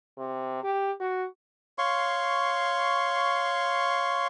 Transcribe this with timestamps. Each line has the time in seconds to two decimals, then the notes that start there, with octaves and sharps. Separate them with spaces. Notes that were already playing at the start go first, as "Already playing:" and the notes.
0.18 C3
0.64 G4
1.00 F#4
1.78 C#5 F5 C6 C#6